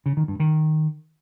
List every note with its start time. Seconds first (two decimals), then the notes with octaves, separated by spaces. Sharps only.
0.06 C#3
0.17 D#3
0.28 G2
0.40 D#3